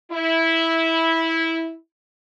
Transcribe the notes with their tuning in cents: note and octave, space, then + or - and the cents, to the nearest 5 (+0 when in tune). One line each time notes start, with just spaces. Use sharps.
E4 -10